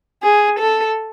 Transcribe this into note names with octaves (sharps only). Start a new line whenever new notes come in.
G#4
A4